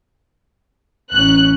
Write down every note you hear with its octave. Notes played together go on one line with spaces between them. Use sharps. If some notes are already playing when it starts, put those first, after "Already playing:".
A1 C#4 F#6